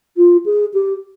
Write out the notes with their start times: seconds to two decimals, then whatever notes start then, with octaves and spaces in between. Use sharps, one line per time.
0.17 F4
0.45 G#4
0.73 G4